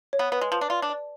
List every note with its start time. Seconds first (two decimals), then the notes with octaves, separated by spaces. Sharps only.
0.13 C#5
0.19 B3
0.32 B3 B4
0.41 G#3
0.51 F3 B4
0.61 D4
0.70 F4 D5
0.82 D4
0.90 D5